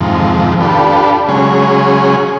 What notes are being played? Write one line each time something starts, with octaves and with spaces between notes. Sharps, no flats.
F2 G#2 C3 D#3 F3
D4 F4 G4 A4 B4
C#3 F#3 G#3 C#4 G#4